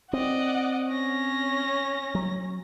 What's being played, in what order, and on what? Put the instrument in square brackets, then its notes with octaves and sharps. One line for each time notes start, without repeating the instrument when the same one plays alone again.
[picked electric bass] C4 [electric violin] D5 D#5 [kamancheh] F#5
[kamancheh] C#4 [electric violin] A#6
[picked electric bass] F#3